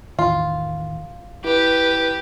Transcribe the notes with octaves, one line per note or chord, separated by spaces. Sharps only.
E2 A2 D#3 F4
E4 G4 B4